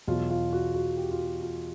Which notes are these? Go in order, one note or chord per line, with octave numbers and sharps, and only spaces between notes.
E2 B2 F#3 F4
F4
F#4
F#4
G4
F4
F#4
F4